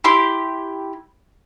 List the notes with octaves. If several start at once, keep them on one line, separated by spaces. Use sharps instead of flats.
E4 G4 C6